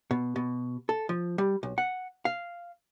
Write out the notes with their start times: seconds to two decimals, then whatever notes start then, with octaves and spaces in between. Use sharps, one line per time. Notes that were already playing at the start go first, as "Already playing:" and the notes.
0.11 B2
0.36 B2
0.89 A4
1.09 F3
1.38 G3
1.63 B1
1.78 F#5
2.25 F5